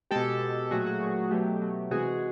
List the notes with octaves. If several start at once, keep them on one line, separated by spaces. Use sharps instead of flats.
B2 G#3 G4 A4
B2 G#3
A#2 F#3 A3 F#4 G#4
F#4
A#2 F#3 A3
B2 F#3 A3 G4
B2 F#3 A3
C3 E3 G#3 F#4 G#4